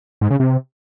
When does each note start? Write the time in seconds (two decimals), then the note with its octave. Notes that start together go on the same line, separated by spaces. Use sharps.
0.21 G#2
0.30 C#3
0.40 C3